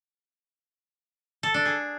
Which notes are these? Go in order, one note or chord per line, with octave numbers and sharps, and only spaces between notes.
A4
D4
G#4